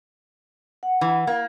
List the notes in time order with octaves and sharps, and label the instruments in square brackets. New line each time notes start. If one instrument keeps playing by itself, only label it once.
[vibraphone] F#5
[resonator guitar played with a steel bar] E3
A#3